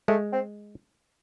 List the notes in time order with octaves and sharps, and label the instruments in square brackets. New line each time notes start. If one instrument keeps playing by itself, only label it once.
[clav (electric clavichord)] G#3 [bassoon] A3
[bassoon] C4